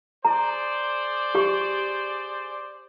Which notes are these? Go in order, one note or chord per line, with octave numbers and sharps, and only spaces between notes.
G#4 C5 D5 A#5
G4 C#6